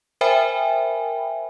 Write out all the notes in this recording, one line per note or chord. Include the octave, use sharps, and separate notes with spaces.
A#4 C5 E5 G5 G#5 B5